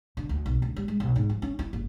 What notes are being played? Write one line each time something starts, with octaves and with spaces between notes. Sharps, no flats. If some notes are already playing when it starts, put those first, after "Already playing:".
D3
D2
B1
D2
G3
G#3
B1
G#2
F3
C#4
E4
F#1